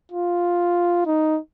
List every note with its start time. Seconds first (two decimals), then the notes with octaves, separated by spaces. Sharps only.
0.12 F4
1.06 D#4